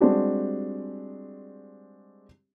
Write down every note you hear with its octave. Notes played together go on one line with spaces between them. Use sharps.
G3 G#3 C4 D4 F#4 G4